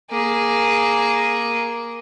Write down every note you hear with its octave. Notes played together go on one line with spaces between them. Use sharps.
A#3 G#4